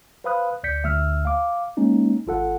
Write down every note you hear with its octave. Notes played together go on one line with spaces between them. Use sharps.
B4 C5 F5 B5 D#6 F#6
D2 D5 G6 B6 C#7
D2 E5 E6 F6
F5 D6
G#3 A#3 C#4 D#4
G#1 F4 A4 F#5